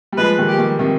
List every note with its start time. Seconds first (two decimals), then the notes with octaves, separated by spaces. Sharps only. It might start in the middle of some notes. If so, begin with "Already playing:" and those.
0.12 G3
0.18 F3 G#3 B4
0.39 D#3 G3
0.48 G4
0.58 D#3 G3
0.79 C3 D#3